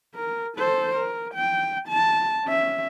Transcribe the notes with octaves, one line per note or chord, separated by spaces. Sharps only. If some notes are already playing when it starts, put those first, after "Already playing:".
A#4
A4 C5
A#4
G5
A5
C#4 E5